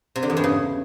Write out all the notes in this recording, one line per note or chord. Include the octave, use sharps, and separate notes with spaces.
C3
D3
E2
G2
C#3